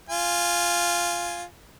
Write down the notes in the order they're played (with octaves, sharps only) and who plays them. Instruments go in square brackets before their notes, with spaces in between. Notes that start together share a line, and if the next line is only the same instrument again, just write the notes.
[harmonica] F4 G#5